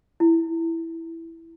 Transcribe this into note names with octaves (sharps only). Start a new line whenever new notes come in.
E4